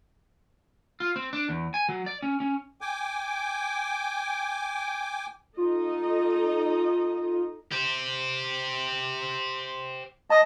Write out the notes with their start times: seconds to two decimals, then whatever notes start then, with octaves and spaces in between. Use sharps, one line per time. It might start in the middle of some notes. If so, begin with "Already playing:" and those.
1.00 F4
1.16 C4
1.33 D4
1.49 E2
1.74 G#5
1.89 F#3
2.06 D5
2.23 C#4
2.40 C#4
2.81 G5 G#5 D6
5.57 D#4 F4 A4 D#5
7.72 G4 C5
10.30 D#5 A5 D#6